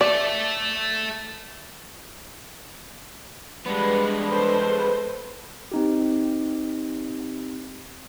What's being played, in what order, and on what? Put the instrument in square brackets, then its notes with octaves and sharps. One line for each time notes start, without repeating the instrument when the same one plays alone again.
[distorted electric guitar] A4 E5 [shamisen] D5
[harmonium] G3 D4 [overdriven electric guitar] G#3 B3 [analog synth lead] B4
[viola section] A4 C5
[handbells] C4 D#4 G4